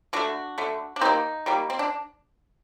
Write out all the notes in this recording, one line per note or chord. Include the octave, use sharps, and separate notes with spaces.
D3 A3 D4 F#4
D3 A3
D4
D#3 G3 A#3 C4 D#4
D#3 G3 A#3
C4
D4